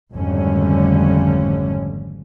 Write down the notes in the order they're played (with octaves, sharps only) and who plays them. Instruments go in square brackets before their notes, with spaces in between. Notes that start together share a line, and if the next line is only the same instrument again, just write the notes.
[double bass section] G#1 F2 D3 G3 A3 C#4